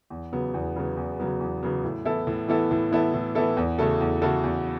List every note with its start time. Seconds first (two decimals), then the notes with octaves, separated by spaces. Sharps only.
0.10 E2
0.33 C#3 F#3 B3
0.54 E2
0.76 C#3 F#3 B3
0.97 E2
1.19 C#3 F#3 B3
1.41 E2
1.63 C#3 F#3 B3
1.84 A2
2.05 E3 B3 E4 A4
2.27 A2
2.48 E3 B3 E4 A4
2.71 A2
2.92 E3 B3 E4 A4
3.14 A2
3.35 E3 B3 E4 A4
3.57 E2
3.78 C#3 A3 F#4 A4
4.01 E2
4.22 C#3 A3 F#4 A4
4.44 E2